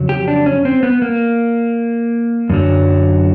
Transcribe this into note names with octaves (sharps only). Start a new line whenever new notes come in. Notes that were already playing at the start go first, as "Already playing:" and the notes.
Already playing: F2 C#3 F#3
G4
D4
C#4
C4
B3
A#3
F#2 D3 F#3